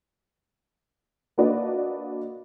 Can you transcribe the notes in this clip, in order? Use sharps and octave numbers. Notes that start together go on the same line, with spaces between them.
A#3 D4 F#4 B4 D5 D#5